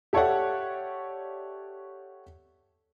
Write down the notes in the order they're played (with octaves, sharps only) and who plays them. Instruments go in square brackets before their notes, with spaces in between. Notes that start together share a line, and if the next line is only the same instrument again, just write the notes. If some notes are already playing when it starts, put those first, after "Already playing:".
[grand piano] G4 A4 C#5 D5 E5 F#5